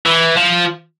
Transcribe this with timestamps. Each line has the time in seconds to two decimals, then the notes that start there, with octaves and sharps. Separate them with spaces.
0.06 E3
0.37 F3